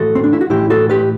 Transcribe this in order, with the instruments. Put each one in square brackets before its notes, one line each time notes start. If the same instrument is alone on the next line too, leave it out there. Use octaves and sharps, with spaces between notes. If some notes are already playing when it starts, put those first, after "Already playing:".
Already playing: [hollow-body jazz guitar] A2 E3 F#4 A4
C4
D4
E4
F#4
A2 E3 E4 G4
F#4 A4
G4 B4